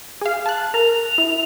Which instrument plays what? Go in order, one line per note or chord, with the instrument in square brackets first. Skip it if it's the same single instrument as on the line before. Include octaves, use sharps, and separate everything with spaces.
[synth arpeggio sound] G#4 F5
A5 F#6
[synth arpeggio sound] A#4 [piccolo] F7
[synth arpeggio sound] E4